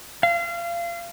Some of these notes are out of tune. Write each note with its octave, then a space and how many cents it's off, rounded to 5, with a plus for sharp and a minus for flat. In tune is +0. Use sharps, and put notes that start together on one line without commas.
F5 -30